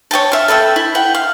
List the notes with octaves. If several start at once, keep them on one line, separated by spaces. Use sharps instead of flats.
C#5 D#5 G5 A5
E5 F5
A4 B4 E5 G5
E4
F#5 G5
F5